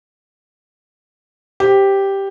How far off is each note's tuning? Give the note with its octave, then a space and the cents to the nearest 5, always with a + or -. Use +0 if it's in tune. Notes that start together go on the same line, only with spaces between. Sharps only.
G4 +0 C5 -5